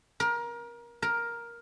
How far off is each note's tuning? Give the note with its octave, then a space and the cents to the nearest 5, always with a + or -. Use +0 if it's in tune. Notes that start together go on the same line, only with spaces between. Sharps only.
A#4 +25
A#4 +10